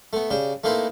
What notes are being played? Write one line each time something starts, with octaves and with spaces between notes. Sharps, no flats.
A3 B3
C#3 D4 G4
A3 A#3 C4 D#4 E4 B4